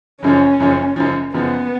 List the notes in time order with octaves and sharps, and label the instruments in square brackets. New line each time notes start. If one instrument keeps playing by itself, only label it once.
[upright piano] F#1 F#2 C#3 F3 [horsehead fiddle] C#4
[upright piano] F#1 F#2 C#3 F3
F#1 F#2 C#3 F3
[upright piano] F#1 F#2 C#3 F3 [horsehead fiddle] B3